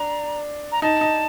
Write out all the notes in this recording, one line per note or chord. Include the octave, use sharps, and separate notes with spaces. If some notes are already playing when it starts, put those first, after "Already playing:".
Already playing: D4 A#5
A#5
D#4 A5
D#4